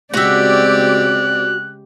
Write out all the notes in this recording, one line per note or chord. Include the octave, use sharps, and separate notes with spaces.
C#3 G#3 C4 F#4 G4 D5 E5 F#6